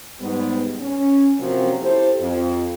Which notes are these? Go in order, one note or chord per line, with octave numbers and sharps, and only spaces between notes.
G#2 G3 B3
C#4
C3 F3 F#3 A#3 C4 C#4
E4 G4 A4 C5
F2